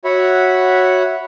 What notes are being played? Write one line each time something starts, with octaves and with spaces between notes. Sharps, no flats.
F#4 C#5 E5 F#5 B5